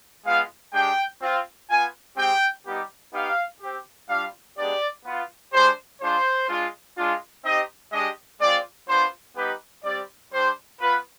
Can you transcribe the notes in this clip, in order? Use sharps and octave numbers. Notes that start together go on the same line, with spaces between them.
G#3 B3 F4 F5
G#3 D4 G4 G5
C4 F4
B3 F4 G#5
G#3 C4 G4 G5
G3 B3 D#4 G4
B3 D#4 G4 F5
C4 G4
G3 D4 F4 F5
G#3 B3 D4 G4 D5
B3 F4
G#3 D4 G4 C5
G#3 D4 F4 C5
G#3 D4 F4
G#3 D4 F4
C4 D#4 G4 D#5
G#3 D4 G4 D#5
G#3 C4 F4 D5
B3 D4 F4 C5
G3 B3 D#4 G4 B4
G3 C4 G4 D5
G3 D4 G4 C5
B3 F4 B4